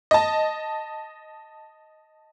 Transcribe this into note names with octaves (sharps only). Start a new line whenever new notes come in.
D#5 A5